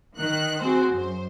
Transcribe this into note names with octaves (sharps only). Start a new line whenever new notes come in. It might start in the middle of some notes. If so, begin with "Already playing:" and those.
D#3 F#6
C4 F#4 G#4 C5
F#2 C5